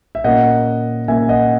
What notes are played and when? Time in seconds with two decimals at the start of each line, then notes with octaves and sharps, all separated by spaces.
0.15 E5
0.24 A#2 A#3 C#4 D#5 F#5
1.08 A#2 A#3 C#4 E5 G#5
1.29 D#5 F#5